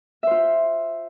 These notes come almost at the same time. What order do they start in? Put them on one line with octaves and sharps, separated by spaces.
E5 C5 F4